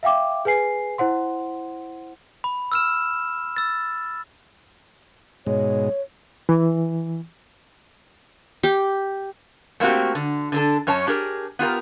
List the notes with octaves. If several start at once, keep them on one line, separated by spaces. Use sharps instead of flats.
E5 F5 G5 D6
G#4 B4 G#5 C7
E4 C5 F#5 C6
B5
E6 F6 E7
E6 A6
G#2 B2 G#3 C#5
E3
G4
A3 A#3 C4 F#4 G4
D3
D3 D4 A4
F#2 C#4 C#5 A5
D4 G4 G#4 A#4
B3 F4 G4 A#4